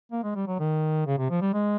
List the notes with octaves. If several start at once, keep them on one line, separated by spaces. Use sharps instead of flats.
A#3
G#3
G3
F#3
D#3
C#3
C3
F3
G3
G#3